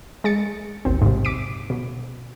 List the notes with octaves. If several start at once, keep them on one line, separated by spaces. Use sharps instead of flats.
G#3 A6 C#7
A1 D#2 C4
G#2 C3
D6 B6 D7
B2